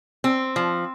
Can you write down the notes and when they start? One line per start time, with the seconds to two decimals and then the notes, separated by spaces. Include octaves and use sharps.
0.24 C4
0.56 F3